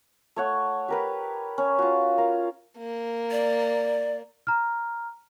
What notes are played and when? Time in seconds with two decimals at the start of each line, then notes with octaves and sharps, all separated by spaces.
0.36 A3 C#5 F#5
0.88 G4 A#4 B4
1.58 C#4
1.79 F4 F#4
2.18 A#4 F5
2.78 A#3
3.31 D5
4.47 A#5 F6